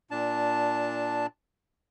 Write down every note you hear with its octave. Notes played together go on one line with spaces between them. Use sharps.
A#2 D4 A5